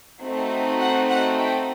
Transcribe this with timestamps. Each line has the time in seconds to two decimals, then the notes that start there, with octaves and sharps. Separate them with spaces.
0.22 A3 C4 D#4 F#4
0.80 F#5
1.09 F#5
1.38 G5